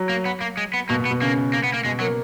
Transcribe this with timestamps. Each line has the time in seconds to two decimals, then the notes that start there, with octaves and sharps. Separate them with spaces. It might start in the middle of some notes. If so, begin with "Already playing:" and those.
Already playing: F#3
0.09 A#3
0.25 B3
0.41 A#3
0.57 G#3
0.74 B3
0.89 B2 A#3
1.00 B2
1.05 B3
1.11 B2
1.21 C#3 A#3
1.53 A#3
1.64 B3
1.74 A#3
1.85 B2 G#3
2.00 F#3 A#3